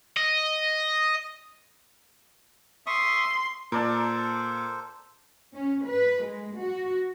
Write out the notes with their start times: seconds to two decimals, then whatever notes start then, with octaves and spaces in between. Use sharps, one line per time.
0.17 D#5
2.86 E5 C6 C#6 D#6
3.72 A#2 A4 A#4 C5 D5 A5
5.55 C#4
5.87 B4
6.25 G#3
6.58 F#4